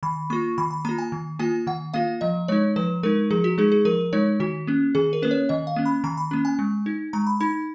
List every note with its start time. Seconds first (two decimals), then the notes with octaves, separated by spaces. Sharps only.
0.03 D#3 B5
0.30 A#3 F4 C#6
0.58 D#3 B5
0.71 B5
0.85 A#3 F4 A#5
0.98 G#5
1.12 D#3
1.39 A#3 F4 G#5
1.67 D#3 F#5
1.94 A#3 F4 F5
2.21 F3 D#5
2.48 G#3 D#4 C#5
2.76 F3 B4
3.03 G#3 D#4 A#4
3.31 F3 G#4
3.44 F#4
3.58 G#3 D#4 G#4
3.72 G#4
3.85 F3 A#4
4.13 G#3 D#4 C#5
4.40 D#3 F#4
4.67 A#3 C#4
4.95 D#3 G#4
5.13 A#4
5.22 A#3 C#4 B4
5.31 C#5
5.49 D#3 D#5
5.67 F5
5.76 A#3 C#4
5.86 B5
6.04 D#3 A#5
6.17 B5
6.31 A#3 C#4
6.45 G#5
6.59 G#3
6.86 D#4
7.13 G#3 A#5
7.27 B5
7.40 D#4 B5